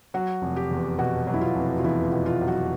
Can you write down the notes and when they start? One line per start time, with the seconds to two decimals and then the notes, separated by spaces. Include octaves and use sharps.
0.14 F#3 F#4
0.42 F1
0.56 G4
0.71 E2
0.98 B2 F#4
1.27 F#3
1.34 E4
1.41 F4
1.56 F1
1.78 F4
1.84 E2 E4
2.05 F4
2.12 B2
2.26 F4
2.41 F#3
2.48 F#4